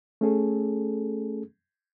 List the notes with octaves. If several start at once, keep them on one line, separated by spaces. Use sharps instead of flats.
A3 C#4 G#4 A4